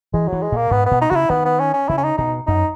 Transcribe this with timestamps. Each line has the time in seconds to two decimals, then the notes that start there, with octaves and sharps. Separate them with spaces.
0.14 E3 G#3
0.28 E3 F#3
0.43 G#3
0.52 A#2 A#3
0.71 G#2 B3
0.86 B3
0.91 B2
1.01 D#4
1.11 C#3 E4 F#4
1.30 D#3 B3
1.45 B3
1.60 C#4
1.74 C#4
1.89 C#3 E4
1.98 C#4
2.04 D#4
2.18 B2 D#4
2.47 F#2 D#4